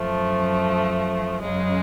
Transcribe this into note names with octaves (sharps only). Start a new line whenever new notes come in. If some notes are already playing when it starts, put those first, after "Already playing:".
Already playing: F#2 F3 A3
F#2 C#3 G#3